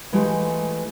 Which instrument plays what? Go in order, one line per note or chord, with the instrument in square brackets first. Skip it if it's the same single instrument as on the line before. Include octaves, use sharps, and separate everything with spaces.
[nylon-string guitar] E3 G#3 A3 F4 G4